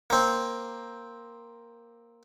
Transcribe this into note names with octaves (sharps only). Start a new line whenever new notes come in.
A#3 C4